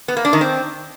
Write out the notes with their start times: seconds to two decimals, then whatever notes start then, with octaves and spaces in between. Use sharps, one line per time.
0.08 B3
0.17 A#3
0.25 D4
0.33 D#3
0.41 C4